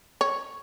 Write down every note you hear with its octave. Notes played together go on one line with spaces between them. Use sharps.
C#5